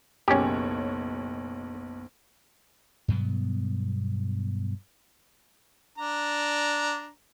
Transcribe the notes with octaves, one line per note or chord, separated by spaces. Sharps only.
F#1 B1 C#4 G4 C#5
G2 B2 F#3 B3
D4 A#5